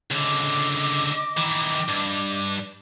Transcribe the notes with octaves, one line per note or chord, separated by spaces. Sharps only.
C#2 D3 D#5 D6
D#3 E3
G2